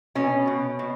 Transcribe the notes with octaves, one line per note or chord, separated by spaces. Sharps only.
B2 C#4
B2
B2